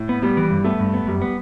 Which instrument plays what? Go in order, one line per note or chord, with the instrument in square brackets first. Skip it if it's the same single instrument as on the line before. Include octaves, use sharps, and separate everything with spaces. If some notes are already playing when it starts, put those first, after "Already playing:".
Already playing: [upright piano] A2
[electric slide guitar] B3
[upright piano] G3 [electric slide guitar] B3
[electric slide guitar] E3
G2
[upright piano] A3 [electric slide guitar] B3
[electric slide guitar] G2
B3
[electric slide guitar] F#2 [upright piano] G3
[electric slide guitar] B3